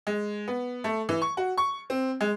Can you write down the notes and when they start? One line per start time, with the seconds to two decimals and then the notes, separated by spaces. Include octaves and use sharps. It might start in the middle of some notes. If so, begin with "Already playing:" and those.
0.07 G#3
0.48 B3
0.84 A3
1.09 E3
1.22 C#6
1.37 F#4
1.58 C#6
1.90 C4
2.21 G#3